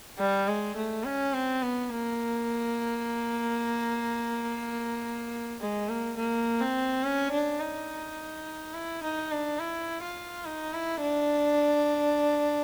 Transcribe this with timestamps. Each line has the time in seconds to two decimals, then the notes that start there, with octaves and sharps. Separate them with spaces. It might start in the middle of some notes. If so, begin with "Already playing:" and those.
0.19 G3
0.48 G#3
0.76 A3
1.04 C#4
1.33 C4
1.62 B3
1.90 A#3
5.61 G#3
5.89 A#3
6.17 A#3
6.61 C4
7.03 C#4
7.32 D4
7.60 D#4
8.74 E4
9.03 D#4
9.31 D4
9.60 E4
10.03 F4
10.45 D#4
10.74 E4
11.02 D4